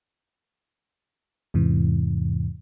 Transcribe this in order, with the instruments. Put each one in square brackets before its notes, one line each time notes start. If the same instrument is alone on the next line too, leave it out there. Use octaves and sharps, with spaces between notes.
[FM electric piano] E2 G#2 C3 E3